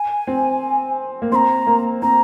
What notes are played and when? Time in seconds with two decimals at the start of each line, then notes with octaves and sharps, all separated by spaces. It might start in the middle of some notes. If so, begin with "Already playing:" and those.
Already playing: G#5
0.27 C4
1.22 A#3
1.32 C4 C6
1.35 A#5
1.67 A#3
2.02 C4 A#5